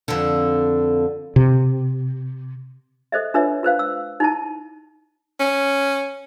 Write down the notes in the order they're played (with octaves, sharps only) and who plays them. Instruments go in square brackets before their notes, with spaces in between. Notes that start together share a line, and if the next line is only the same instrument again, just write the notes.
[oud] F2 D3
[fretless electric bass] C3
[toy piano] A4 C5 D#5 E5
D4 F4 B4 C#5 E5
F4 B4 C5 F5
E6
D#4 E4 A5
[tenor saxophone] C#4